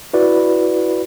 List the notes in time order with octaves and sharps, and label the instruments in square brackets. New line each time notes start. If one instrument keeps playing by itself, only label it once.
[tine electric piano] E4 F#4 B4 D5